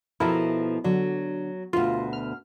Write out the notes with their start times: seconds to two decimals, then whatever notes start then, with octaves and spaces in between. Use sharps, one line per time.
0.20 B2 F3 E4 A4 A#4
0.84 D3 F#3
1.73 D2 B2 F4
2.13 F6